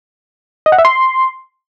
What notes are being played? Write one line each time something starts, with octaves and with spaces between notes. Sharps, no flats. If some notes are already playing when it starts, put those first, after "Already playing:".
D#5
F#5
E5
C6